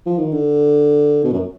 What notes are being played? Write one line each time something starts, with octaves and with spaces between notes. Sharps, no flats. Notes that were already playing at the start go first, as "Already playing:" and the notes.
F3
D#3
D3
B2
F#2